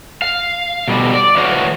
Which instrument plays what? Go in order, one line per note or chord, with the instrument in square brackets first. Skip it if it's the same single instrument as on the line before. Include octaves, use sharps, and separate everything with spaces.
[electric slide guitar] F5
B2 G3
D5
E3 F#4 C#5 F5